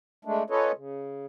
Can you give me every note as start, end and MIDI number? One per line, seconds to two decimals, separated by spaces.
0.25 0.43 56
0.25 0.43 57
0.25 0.43 62
0.50 0.72 61
0.50 0.72 65
0.50 0.72 69
0.50 0.72 71
0.50 0.72 73
0.50 0.72 75
0.76 1.26 49